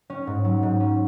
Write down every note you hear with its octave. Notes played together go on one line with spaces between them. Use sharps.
C#4
G#2
F#3
G#2
C#4